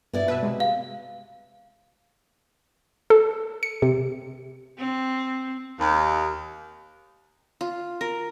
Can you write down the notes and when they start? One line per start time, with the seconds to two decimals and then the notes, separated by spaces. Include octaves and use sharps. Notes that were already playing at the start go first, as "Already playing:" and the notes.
0.13 G2 B3 E4 D5
0.28 B2 B4 E5
0.43 C3 G#3
0.60 F5
3.10 A4
3.63 C#7
3.82 C3
4.78 C4
5.80 D#2
7.61 F4
8.01 A#4